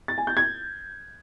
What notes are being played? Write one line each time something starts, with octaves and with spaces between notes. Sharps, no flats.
A6
G#5
G6
G#6